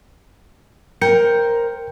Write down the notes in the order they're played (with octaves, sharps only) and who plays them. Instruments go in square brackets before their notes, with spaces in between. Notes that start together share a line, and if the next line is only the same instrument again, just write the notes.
[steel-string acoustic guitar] A#4 C5 [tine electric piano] G5 G6 C#7